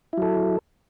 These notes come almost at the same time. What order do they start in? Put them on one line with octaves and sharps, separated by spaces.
E4 F#3 A4